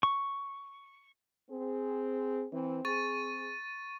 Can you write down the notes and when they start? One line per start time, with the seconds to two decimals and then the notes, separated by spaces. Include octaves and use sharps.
0.03 C#6
1.51 C4 G#4
2.52 E3 C4
2.85 C4 G#4 C#6 A6 D#7